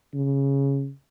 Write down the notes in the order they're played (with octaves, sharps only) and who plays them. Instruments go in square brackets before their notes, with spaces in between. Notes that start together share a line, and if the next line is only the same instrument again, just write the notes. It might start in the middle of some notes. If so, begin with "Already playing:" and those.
[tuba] C#3